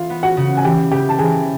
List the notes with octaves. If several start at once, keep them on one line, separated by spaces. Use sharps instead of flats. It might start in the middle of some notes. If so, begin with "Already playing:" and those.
Already playing: E3 F4 F5
B3
F#4 F#5
C#3
G#5
E3 G4 G5
C#3 G4 G5
A5
E3 G#4 G#5